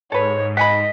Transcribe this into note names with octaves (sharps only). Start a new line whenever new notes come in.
G#2 A4 B4 C#5
D#5 F#5 G#5 B5 B6